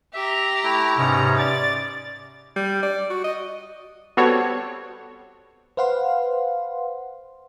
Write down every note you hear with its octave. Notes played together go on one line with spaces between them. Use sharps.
G4 E5 A#5
A3 E4
G#2 C3 B3 C#4 A#5
D5 A6
G3
D5
F#4
D#5
G3 B3 C4 F#4 A4 C#5
B4 C5 F5 F#5 C6